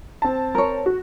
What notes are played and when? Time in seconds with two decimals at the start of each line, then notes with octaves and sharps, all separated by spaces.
0.22 C4 A5
0.55 A#4 C#5
0.86 F#4